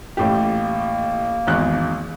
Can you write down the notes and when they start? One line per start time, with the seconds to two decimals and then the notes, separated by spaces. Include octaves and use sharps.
0.17 A1 A2 A#3 G4
1.47 G#1 E2 F#6